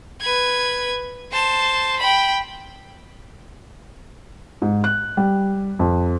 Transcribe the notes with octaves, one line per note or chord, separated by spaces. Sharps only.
B4 G#6
C5 A5
G5 B5
G#2
F#6
G3
F2